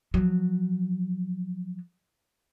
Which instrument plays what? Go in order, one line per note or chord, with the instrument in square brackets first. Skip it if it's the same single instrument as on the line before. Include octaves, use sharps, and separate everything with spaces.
[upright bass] F3 F#3